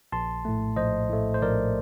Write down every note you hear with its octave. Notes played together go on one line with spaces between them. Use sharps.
A#1 A5 C6
A2 A3
A#1 C5 D#5
A2 A3
C5
A#1 A#4 D5